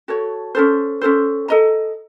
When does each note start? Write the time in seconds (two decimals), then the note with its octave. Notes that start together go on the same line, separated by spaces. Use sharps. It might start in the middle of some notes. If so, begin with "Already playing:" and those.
0.08 F#4 A4 C#5
0.55 C#4 F4 A4 C5
1.01 C#4 F4 A4 C5
1.48 A4 D#5 A#5